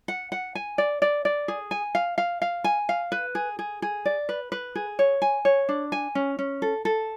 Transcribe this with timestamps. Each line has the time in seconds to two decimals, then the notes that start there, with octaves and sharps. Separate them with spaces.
0.08 F#5
0.32 F#5
0.55 G#5
0.78 D5
1.02 D5
1.25 D5
1.48 G#4
1.71 G#5
1.95 F5
2.18 F5
2.42 F5
2.64 G#5
2.89 F5
3.12 B4
3.35 G#4
3.59 G#4
3.82 G#4
4.05 D5
4.29 B4
4.52 B4
4.75 G#4
4.99 C#5
5.22 G#5
5.45 C#5
5.69 D4
5.92 G#5
6.15 C#4
6.39 C#4
6.62 A4
6.85 A4